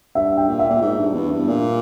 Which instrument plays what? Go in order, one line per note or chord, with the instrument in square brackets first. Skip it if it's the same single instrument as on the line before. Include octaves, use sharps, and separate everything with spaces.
[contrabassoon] G2 [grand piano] E5
[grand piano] G5
[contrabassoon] A#2
[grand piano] E5
[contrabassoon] A#2
G#2
G2
E2
G2
A#2